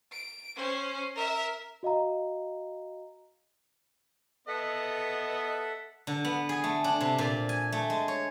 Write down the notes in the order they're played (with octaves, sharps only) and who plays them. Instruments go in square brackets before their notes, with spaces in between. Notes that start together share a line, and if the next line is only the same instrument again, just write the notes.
[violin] D7
C#4 C5
A#4 E5
[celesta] F#4 D#5 F5 A#5
[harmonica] B3 D#5 [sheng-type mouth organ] A4 E5 F#5
[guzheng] D3
B3
G#4
A3
D4
C3
A#2
G#5
A3
G#3
C#5